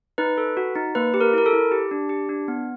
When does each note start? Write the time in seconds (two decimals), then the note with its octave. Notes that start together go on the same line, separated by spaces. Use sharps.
0.18 D#4 B4
0.38 A4
0.57 F#4
0.75 D#4
0.95 A#3 B4
1.14 G4
1.21 A#4
1.33 E4 A#4
1.46 A4
1.53 E4
1.72 G4
1.91 D4
2.09 G4
2.29 D4
2.48 B3